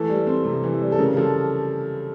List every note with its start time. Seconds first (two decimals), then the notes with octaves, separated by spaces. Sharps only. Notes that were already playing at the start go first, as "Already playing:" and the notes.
Already playing: E3 A3 A4
0.10 G3
0.27 C4
0.45 C3
0.64 E3
0.81 G3
0.92 A4
0.99 C#3 A#4
1.17 F3 A4